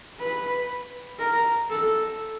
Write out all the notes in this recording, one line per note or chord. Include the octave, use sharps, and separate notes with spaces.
B4
A#4
A4